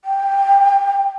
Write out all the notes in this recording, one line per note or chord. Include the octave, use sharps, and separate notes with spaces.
G5